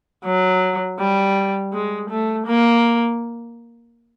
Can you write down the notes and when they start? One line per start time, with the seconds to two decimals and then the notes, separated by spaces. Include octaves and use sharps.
0.25 F#3
0.99 G3
1.73 G#3
2.10 A3
2.47 A#3